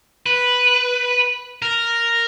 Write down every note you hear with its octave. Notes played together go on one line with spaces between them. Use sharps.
B4
A#4